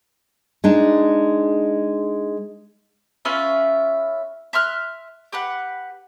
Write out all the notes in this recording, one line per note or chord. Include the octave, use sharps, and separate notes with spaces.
G#3 D4 D#4
C#4 F4 B4 E5
E5 C6 F6 F#6
G4 B4 F#5